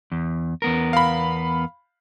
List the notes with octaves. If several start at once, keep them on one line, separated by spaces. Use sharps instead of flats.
E2
E2 B3 A#4
F5 B5